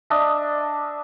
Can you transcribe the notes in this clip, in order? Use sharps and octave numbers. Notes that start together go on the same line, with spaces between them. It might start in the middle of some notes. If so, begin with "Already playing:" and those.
D4 D#5 E5